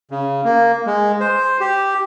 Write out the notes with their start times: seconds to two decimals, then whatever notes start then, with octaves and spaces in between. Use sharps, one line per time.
0.11 C#3
0.44 A#3
0.86 G#3
1.21 C5
1.60 G4